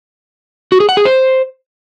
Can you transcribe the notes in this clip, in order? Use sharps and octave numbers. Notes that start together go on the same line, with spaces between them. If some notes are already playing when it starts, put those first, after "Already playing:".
F#4
G#4
F#5
G#4
C5